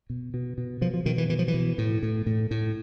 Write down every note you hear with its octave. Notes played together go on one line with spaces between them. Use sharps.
B2
B2
B2
B2 F3
F3
B2 D#3
E3
B2 E3
F3
E3
B2
A2
A2
A2
A2